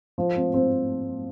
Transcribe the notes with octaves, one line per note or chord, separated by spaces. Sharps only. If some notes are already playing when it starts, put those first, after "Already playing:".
F3
C4
C4